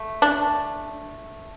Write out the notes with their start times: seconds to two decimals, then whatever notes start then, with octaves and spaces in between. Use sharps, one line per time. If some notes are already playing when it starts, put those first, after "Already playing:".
Already playing: A3
0.22 D4